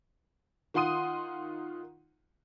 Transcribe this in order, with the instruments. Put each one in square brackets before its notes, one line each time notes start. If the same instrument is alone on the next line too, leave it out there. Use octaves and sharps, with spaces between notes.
[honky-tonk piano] D#3 F4 F#5 C6 D#6 D#7